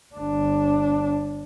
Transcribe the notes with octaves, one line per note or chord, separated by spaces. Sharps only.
G1 D4